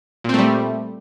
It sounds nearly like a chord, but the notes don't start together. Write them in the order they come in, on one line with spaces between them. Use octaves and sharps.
A#2 C4 A3 G3